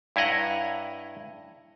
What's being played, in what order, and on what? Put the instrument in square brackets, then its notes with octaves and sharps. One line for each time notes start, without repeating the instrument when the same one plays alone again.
[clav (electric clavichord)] G2 E4 C#5 D#5 F#5 A#5